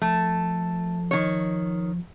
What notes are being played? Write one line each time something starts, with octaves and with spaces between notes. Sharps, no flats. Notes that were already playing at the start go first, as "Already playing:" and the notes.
F3 A3
D#3 C#5